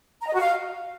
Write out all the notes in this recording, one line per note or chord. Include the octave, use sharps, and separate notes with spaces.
A#5
D#5
F#4
F5